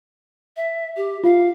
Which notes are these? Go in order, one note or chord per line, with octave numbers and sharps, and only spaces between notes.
E5
G4
F4 F5